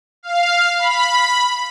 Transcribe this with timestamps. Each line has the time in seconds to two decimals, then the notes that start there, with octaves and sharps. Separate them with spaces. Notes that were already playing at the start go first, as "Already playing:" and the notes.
0.23 F5
0.79 B5